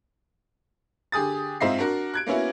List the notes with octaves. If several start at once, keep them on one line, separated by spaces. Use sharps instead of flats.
D3 G4 G#4 D#6 A6
G#2 C4 F4 D#5 E5 C7
D4 F#4 A#4
F#6 G#6 D7
A#3 B3 C#4 E4 F#4